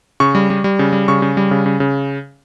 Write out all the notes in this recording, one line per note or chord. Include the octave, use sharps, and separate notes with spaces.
C#3 C#6
G3
G3
G3
C#3
G3
C#3 C#6
C#3
G3
C#3
C#3
C#3